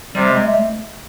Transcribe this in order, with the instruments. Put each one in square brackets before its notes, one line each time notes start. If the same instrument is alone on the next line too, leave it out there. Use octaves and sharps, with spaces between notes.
[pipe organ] C3 [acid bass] G3
[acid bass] G#3
A3